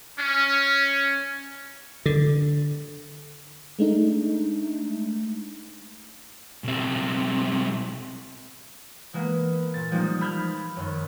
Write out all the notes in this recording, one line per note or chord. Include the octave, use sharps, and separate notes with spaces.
C#4
D3
G#3 A3 D4 D#4
B1 C4
E3 G#3 A#3 B3
A#2 A6
F3 G3 G#3 A#3 D#4
B5 E6 F6 G6 G#6 B6
F#2 D#3